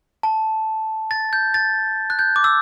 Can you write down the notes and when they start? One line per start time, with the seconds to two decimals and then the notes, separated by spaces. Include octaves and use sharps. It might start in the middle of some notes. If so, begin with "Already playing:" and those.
0.23 A5
1.11 A6
1.33 G6
1.54 A6
2.10 F#6
2.19 G6
2.36 D6
2.44 E6